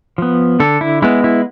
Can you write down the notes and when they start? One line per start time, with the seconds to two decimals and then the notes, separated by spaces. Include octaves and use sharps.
0.18 F3 B3
0.60 D3 A4
0.81 E4
1.02 G#3 B3 E4
1.24 E4